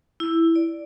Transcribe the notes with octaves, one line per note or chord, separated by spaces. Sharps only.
E4
D5